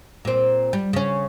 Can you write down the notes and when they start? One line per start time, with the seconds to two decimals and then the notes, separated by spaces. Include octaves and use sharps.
0.25 A#2 C4
0.73 G3
0.93 C#3 C#4